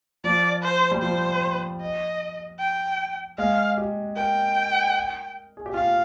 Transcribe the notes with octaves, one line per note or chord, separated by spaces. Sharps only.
F3 D5
C5
G3
F3 C5
D#5
G5
G#3 F5
G4
A#4 G5
G#4
G4
F4 F5